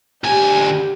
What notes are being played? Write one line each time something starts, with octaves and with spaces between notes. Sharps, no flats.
D2 G4 G#5